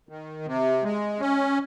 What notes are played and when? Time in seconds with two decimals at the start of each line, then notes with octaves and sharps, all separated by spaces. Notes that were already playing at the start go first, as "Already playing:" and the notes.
0.09 D#3
0.46 C3
0.83 G#3
1.20 C#4